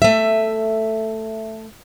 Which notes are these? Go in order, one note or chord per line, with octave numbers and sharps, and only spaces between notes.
A3 E5